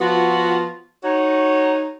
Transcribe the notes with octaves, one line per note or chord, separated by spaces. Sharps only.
F3 B3 F4 F#4
D#4 F#4 C#5